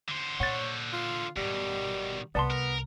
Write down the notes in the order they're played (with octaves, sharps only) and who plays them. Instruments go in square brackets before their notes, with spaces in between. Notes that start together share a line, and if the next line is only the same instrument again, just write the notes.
[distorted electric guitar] D3 C5
[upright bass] A#2 [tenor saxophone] C#5 [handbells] F#5 A6
[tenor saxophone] F4
[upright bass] G#1 [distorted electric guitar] B2 D#3 [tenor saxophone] G3
[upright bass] C2 [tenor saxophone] B3 [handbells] D5 A5 C6
[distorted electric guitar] A#4